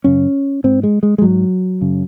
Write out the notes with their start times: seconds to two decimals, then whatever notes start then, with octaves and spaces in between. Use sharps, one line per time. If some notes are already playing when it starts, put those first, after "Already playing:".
0.04 F#2 C#3 C#4
0.64 G#2 C4
0.83 G#3
1.03 G#3
1.18 G#3
1.22 G#2 F#3
1.81 F#2 C#3